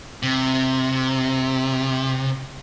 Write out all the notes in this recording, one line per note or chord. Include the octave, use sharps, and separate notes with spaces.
C3